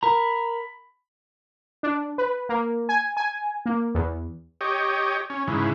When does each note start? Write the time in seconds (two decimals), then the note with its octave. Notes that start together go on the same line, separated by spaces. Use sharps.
0.03 A#4 A#5 B5
1.83 D4
2.18 B4
2.49 A#3
2.89 G#5
3.17 G#5
3.66 A#3
3.95 E2
4.61 G4 C#5 D#5
5.30 C#4
5.48 G#2 C#3 E3